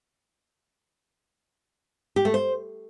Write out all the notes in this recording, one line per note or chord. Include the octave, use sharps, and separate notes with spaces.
G4
A3
C5